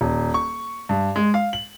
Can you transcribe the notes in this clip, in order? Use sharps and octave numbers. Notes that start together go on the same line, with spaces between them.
D#1
C#6
G2
G#3
F5
F#7